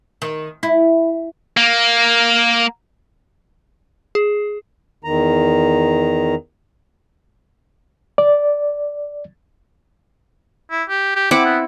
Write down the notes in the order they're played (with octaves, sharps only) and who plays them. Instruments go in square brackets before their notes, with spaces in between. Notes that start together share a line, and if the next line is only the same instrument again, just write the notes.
[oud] D#3
E4
[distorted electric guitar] A#3
[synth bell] G#4
[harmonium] E2 D#3 A#5
[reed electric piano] D5
[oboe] E4
G4
G4
[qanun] C4 E4 F#5 [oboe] D6
[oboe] B3